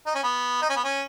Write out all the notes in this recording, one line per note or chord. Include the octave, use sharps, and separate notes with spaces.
D#4
C#4
B3
D#4
C#4
B3
C#4